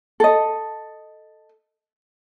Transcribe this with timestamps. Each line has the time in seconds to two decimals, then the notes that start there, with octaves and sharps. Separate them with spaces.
0.20 A4 D#5